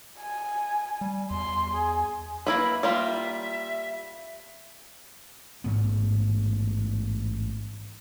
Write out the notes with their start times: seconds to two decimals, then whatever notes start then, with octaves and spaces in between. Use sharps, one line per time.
0.21 G#5
1.01 G3
1.31 E2 C6
1.74 G#4
2.46 A#3 E4 B4 B5
2.83 G3 A#3 F4 E5
5.64 A1 G#2 B3